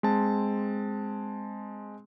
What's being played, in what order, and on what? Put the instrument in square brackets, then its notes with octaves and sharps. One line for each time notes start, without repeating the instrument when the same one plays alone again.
[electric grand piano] G#3 C4 A5